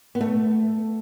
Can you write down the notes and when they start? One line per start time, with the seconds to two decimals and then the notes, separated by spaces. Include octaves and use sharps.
0.15 B3
0.21 A3